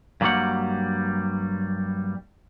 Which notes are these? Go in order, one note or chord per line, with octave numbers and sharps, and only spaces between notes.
G2 D3 F#3 G3 A#3 F#5